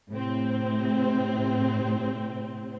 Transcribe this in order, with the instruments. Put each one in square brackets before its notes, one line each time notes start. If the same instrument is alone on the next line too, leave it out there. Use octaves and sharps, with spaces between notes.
[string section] A2 C3 C4